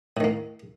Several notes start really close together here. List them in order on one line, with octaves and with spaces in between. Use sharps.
A2 D#3 A#3